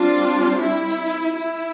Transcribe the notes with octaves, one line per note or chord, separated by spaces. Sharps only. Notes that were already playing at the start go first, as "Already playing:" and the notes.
Already playing: G3 C4 D4 F4
E4
E4